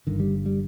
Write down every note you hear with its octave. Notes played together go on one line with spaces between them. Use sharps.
G1 G2 D3 D#3
G3
G3